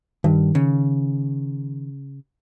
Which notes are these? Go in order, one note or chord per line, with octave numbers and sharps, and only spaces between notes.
G2 D#3
C#3